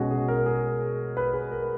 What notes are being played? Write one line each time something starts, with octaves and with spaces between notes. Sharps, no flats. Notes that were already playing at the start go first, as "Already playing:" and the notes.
Already playing: B2 G#3 C#4 F#4 G#4
G#4
A#4
G#4
B4
G#4
A#4